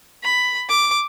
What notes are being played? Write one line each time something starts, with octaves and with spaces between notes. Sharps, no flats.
B5
D6